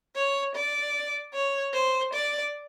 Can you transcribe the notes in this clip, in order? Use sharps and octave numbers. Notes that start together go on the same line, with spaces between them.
C#5
D5
C#5
C5
D5